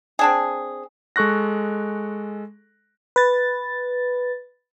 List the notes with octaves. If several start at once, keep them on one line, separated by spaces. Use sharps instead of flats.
C4 D4 G#4
G#3 A4 C#6 F#6 A#6
B4 A6